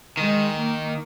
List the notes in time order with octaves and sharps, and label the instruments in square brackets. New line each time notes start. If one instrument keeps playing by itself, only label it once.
[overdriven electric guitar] D#3 [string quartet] G#3
[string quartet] A#3